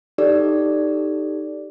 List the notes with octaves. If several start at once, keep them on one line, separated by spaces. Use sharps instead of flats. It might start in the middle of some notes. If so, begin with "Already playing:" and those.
D#4 G4 A4 D5